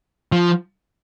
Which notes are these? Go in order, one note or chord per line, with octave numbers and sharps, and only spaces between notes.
F3